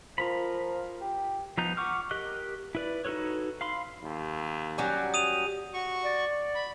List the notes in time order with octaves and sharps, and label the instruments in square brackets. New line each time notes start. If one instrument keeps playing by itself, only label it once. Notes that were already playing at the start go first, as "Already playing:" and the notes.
[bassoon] F3 [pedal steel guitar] F4 A#4 B5
[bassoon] G4
[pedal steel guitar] F3 B3 D#4 A#5 G6
F#5 C#6 D6 F6
G4 A#4 D#5 F#6
E4 B4 D5
D#4 F#4 A4 B4 C#5
F5 B5 C6
[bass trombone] D#2
[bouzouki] F#3 G3 C#4
[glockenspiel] D#6 D#7 F7
[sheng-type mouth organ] F#4 C#6
[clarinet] D5
[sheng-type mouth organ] B5